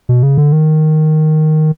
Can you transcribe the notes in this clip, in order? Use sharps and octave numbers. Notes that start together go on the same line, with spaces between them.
B2
C#3
D3
D#3